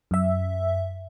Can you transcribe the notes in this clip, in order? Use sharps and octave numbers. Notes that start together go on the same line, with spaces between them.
F#2 E5